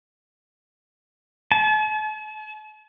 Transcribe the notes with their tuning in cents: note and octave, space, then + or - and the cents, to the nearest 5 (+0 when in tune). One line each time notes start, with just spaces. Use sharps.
A5 -45